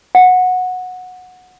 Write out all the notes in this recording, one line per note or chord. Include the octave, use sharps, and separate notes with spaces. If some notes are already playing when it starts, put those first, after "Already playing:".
F#5